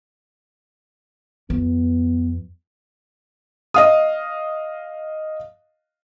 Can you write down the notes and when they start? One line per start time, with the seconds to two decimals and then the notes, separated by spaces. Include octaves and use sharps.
1.50 F2 B3
3.74 D#5 F5 D#6